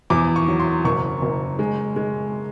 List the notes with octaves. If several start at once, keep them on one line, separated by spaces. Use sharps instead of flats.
E2 D6
C#6
F#3
C6
F#1 C#6
F#1
G#3
G#3